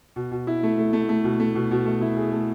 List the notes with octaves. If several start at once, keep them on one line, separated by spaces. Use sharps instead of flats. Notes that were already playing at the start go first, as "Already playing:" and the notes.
B2
B2
E4
A3
A3
A3
A3
B2
A3
B2
B2
A3
E4
G#4
A3